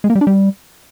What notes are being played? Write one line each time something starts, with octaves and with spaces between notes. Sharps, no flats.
G#3
A#3
G3
D4
G3